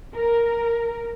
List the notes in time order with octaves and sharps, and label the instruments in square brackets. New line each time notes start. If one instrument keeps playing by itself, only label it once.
[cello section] A#4